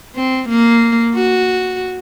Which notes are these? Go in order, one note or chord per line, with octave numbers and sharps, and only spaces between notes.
C4
A#3
F#4